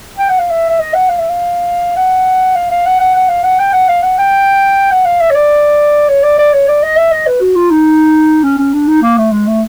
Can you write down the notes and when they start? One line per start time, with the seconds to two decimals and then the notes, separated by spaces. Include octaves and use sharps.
0.18 G5
0.29 F#5
0.39 F5
0.50 E5
0.69 E5
0.80 D#5
0.94 F#5
1.09 F5
1.19 E5
1.29 F5
1.96 F#5
2.55 F5
2.71 F5
2.86 F#5
2.99 F#5
3.15 F#5
3.29 F5
3.44 F#5
3.59 G5
3.73 F#5
3.88 F5
4.03 F#5
4.18 G5
4.91 F#5
5.05 F5
5.20 E5
5.30 C#5
5.35 D5
6.09 C#5
6.23 D5
6.39 D5
6.53 C#5
6.68 D5
6.83 D#5
6.97 E5
7.11 D#5
7.27 B4
7.41 F#4
7.55 F4
7.71 D#4
8.44 C#4
8.58 C#4
8.74 D4
8.88 D#4
9.02 A#3
9.18 A3
9.32 G#3
9.47 A3